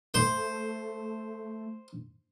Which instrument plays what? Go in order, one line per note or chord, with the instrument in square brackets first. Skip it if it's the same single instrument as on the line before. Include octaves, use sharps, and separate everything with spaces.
[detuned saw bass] A3 [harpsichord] C5